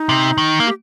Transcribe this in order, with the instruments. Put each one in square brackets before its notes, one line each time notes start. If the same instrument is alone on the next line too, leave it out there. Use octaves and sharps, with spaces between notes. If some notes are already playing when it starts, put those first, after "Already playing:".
Already playing: [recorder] D#4
[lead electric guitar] C3
D#3
A#3
[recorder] G4